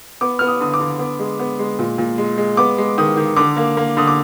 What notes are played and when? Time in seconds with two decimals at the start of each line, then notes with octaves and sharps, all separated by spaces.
0.21 B3 D6
0.39 B3 F6
0.47 D#6
0.60 D3 D#6
0.74 D6
0.80 D3
0.99 B3
1.19 G#3
1.39 B3
1.59 G#3
1.79 A#2
1.98 A#2
2.18 G#3
2.38 G#3
2.57 B3 D6
2.78 G#3
2.98 D#3 D#6
3.17 D#3
3.36 D3 D6
3.57 A#3
3.77 A#3
3.97 D3 D#6
4.07 D6